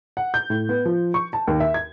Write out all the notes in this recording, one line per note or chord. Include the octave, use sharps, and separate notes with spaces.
F#5
G6
A2
B3
F3
C#6
A5
D#2
E5
G#6